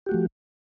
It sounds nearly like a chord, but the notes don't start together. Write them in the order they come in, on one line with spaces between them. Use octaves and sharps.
G4 F#4 A3 F3